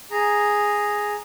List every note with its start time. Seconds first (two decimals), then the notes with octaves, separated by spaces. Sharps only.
0.11 G#4 A#5